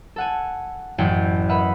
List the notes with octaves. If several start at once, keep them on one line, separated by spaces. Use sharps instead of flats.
A4 F#5 G#5
A1 F#2 E4 F#5 G5
A#4 B4 D#5 E5 F#5 B5